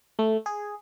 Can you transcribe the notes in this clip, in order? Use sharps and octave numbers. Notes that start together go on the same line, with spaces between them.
A3
G#4